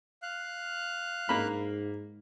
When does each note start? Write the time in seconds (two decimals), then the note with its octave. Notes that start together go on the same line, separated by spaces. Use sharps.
0.22 F5 F#6
1.29 G#2 A#3 B5